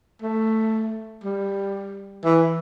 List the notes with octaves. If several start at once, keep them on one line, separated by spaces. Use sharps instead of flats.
A3
G3
E3